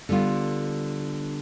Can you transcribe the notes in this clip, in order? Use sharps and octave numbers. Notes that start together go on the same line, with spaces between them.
D3 G3 B3 F4